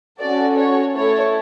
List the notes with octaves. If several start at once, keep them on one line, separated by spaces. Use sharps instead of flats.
C#4 F#4 A4 D5
C#5
A3 E4 A4 C#5